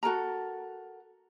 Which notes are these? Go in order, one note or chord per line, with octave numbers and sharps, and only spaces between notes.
F#4 A4 A#4 A#5